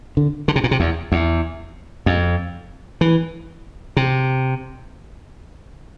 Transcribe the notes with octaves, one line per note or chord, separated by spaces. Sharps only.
D3
D3
C3
A#2
C3
E2
E2
F2
E3
C3